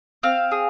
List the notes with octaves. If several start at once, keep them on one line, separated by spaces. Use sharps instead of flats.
C4 F5
G#4